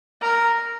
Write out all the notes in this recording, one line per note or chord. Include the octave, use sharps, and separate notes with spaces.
A#4